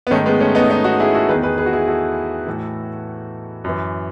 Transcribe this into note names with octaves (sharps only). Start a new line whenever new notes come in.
B3
G#2 D#3 A3 C#4
G#3 B3
A3 C#4
B3 D#4
B3 D#4
D#4 F#4
E4 G#4
F#4 A4
E2 D#3 G#4 B4
G#4 B4
G#4 B4
F#4
E4 G#4
F#4 A4
A2 E3
F#2 E3